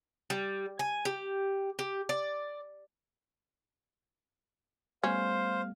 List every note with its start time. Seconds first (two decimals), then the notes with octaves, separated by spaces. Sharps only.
0.30 G3
0.79 G#5
1.05 G4
1.79 G4
2.09 D5
5.04 G3 A3 B3 C#4 C5 F5